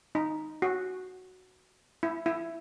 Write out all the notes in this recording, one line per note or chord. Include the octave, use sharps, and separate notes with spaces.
D#4
F#4
E4
E4